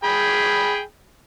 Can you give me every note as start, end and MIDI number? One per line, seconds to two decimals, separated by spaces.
0.04 0.81 68
0.04 0.81 79
0.04 0.81 83